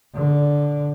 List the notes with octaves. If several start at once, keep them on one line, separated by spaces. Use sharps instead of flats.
D3